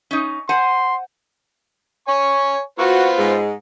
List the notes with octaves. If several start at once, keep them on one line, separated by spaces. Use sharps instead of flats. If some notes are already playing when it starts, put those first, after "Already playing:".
C#4 D#4
C5 F#5 G#5 C6
C#5 G#5 C#6
B3 F4 F#4 C5
G#2 G#3